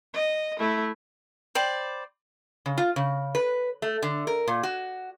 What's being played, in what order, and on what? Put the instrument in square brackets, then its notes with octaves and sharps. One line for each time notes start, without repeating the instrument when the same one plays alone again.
[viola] D#5
A3 E4
[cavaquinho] C5 D5 G5 B5
[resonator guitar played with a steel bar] C#3
F4
C#3
B4
A3
D3
A#4
A#2
F#4